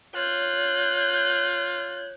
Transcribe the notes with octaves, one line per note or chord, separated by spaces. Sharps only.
F4 C#5 F#6 G6